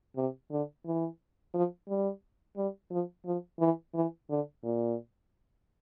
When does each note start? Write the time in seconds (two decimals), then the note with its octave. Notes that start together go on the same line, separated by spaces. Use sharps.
0.16 C3
0.51 D3
0.86 E3
1.54 F3
1.88 G3
2.57 G3
2.91 F3
3.25 F3
3.60 E3
3.94 E3
4.30 D3
4.64 A#2